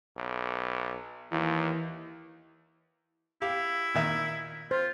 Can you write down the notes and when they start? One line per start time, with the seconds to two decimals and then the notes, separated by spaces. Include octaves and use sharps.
0.17 B1
1.32 D#2 E3
3.42 E4 G4 F5
3.94 A#2 D#3 E5
4.71 F4 C5